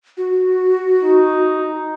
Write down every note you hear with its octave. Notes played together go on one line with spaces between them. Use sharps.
F#4
D#4